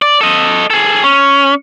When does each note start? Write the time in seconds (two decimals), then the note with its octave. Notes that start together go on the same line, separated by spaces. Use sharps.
0.02 D5
0.21 A4 D#5
0.70 G#4 A4
1.04 C#4